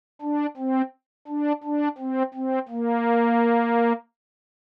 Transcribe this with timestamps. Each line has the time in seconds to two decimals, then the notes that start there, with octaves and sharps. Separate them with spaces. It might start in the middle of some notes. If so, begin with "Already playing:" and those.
0.21 D4
0.57 C4
1.27 D4
1.63 D4
1.98 C4
2.34 C4
2.69 A#3